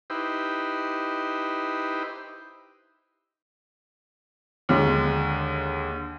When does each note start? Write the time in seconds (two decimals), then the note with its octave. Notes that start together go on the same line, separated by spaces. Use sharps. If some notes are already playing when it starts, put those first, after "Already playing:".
0.10 D#4 E4 G4 B4 C5
4.69 D#2 D3 G#3